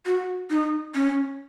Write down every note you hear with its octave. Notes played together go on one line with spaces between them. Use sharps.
F#4
D#4
C#4